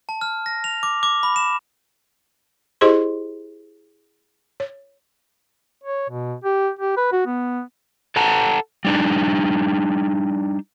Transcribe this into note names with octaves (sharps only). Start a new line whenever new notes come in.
A5
F6
A#6
F7
D6
D6
B5
E7
E4 G4 G#4 C5 D#5 C6
C#5
C#5
B2
G4
G4
B4
F#4
B3
A4 F#5 A5 A#5
G3 D4 D#4